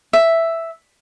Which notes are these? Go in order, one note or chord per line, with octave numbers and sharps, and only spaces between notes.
E5